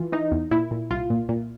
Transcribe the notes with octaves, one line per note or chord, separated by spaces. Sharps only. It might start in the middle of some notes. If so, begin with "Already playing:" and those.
Already playing: E3 F4
E3 D#4
E2
A#2 E4
A#2
C2 F4
A#2
A#2